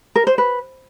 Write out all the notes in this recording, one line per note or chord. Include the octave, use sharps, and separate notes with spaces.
A#4
C5
B4